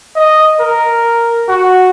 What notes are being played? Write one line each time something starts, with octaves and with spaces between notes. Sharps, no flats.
D#5
A#4
F#4